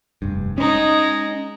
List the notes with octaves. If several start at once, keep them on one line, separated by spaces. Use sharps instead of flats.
F1 G2
G#3 C#4 D#4